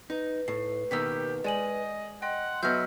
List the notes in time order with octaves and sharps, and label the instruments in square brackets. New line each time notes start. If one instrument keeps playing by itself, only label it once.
[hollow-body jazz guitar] D#4 [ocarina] B4
[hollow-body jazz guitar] A2 [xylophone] C7
[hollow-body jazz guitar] B2 D#3 A#3 [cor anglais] G4 [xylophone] E6 B6
[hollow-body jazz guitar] G#3 [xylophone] D5 G#5 F#7 [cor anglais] D#5
[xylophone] D#5 G5 [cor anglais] F#5 [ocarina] C6
[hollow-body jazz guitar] F#3 B3 [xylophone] D#5 F6 G6 [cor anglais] E5